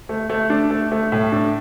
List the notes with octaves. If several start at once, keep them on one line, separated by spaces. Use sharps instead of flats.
A3
A3
D4
A3
A3
A2
D4